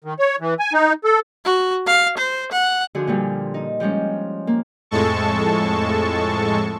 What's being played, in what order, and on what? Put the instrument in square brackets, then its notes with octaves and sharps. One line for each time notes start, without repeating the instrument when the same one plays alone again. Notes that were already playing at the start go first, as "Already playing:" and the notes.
[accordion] D#3
C#5
E3
G#5
D#4
A4
[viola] F#4
F5
C5
F#5
[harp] D3 F3 D4 F#4 G#4
A#2 F3 G3
D#4
F3 G3 G#3 C#4
A#3
[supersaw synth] F2 A2 G#3 A4 A5 C#6